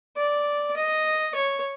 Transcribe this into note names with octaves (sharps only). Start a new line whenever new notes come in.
D5
D#5
C#5